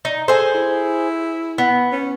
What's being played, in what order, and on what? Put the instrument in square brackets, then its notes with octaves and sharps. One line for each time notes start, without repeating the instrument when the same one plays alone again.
[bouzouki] D#4
[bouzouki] G#4 C5 [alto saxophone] A4
[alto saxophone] E4
[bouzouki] B3
[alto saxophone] C#4